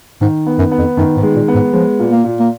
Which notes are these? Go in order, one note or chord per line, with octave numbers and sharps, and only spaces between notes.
G#2 D#3
B3
F#2
B3
F2
F#2 D#3
G#2
G#3
A#2
B3
G#2
F3 G#3
A#2
A#3
A#2
A#3